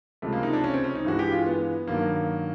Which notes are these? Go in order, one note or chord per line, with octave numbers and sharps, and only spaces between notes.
C#2 C3 F3 G#3 A3
A#3
D#4
D4
C#4
C4
C#4
D#4
G2 E3 G#3 F#4
G4
F4
B3
G2 D#3 F#3 A#3